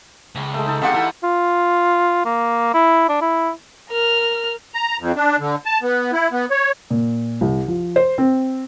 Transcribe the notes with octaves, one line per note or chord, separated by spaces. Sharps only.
C#2
G#3 A3
D#4 A4
G#3 C4 F4 G4 F5 F#5
E3 E4 A4
F4
A#3
E4
D4
E4
A#4 F6
A#5
F2
D4
D3
A5
B3
E4
B3
C#5
A#2
C2
F3
C5
C4